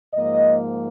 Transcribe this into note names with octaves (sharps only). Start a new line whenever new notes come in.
G#2 F3 A#3 D#5